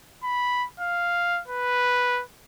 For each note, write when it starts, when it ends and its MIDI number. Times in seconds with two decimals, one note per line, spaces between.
0.23 0.66 83
0.80 1.41 77
1.48 2.22 71